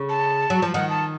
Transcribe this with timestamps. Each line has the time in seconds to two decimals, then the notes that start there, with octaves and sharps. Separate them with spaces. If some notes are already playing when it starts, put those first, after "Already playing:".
Already playing: C#3
0.09 A5
0.50 F#3
0.62 F3
0.74 D#3 F#5
0.90 A5